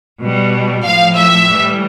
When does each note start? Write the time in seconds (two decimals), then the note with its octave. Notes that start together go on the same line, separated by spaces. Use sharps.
0.21 B2 G3
0.84 A2 F3 F5
1.15 E5
1.47 A2 E3 G3